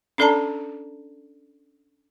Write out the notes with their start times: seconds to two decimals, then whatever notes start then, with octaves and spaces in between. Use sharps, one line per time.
0.18 C#4 D4 A4 D5 A5 A#5